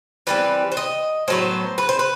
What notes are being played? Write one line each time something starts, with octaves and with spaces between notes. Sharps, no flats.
E3 G3 C4 B4
C5
D#5
A2 F#3 B3 C5
B4
C5
B4